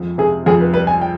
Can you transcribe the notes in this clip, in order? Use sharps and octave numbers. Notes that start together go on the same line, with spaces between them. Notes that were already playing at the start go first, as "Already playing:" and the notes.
Already playing: F2 G#3
C3 G#4
F2 G#4
B4
G3 B4
G#5
G5